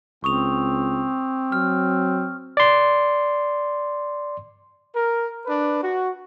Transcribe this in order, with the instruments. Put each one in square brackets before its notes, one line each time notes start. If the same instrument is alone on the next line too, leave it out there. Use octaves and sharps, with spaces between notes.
[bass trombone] C#2 [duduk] C4 [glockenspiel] C#6 D#6 F7
[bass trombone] F#3 [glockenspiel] F6
[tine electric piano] D5 C6
[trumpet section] A#4
D4 B4
F#4